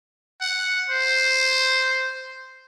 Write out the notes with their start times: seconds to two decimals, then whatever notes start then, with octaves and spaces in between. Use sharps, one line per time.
0.41 F#5
0.90 C5